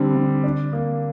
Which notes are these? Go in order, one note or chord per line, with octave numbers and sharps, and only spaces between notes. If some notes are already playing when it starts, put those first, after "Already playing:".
Already playing: D3 G3 C4
D3
D4
A#3